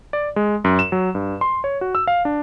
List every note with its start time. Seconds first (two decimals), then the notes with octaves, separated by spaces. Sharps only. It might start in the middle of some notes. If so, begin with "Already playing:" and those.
0.13 D5
0.36 G#3
0.64 F#2
0.79 E7
0.92 F#3
1.15 G2
1.41 C6
1.64 C#5
1.81 F#4
1.95 E6
2.07 F5
2.25 D4